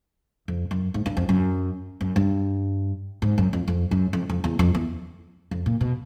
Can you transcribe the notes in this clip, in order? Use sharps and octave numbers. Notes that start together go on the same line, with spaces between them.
F2
F#2
G#2
G2
F2
F#2
F#2
G2
G#2
F#2
F2
F2
F#2
F2
F2
E2
F2
E2
F2
A#2
B2